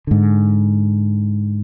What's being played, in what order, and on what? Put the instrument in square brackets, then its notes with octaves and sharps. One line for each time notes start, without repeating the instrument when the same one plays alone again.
[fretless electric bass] G#2 D3